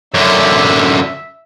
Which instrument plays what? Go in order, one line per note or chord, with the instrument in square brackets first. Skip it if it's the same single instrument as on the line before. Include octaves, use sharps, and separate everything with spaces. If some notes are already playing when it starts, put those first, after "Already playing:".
[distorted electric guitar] F#2 D3 [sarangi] E5